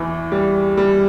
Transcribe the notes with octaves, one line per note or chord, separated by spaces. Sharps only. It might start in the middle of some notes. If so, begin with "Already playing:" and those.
Already playing: E2 E3
G3
G3